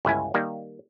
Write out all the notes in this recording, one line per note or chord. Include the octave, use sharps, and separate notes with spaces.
G1 C#2 E4 G#5
D#3 G3 A#3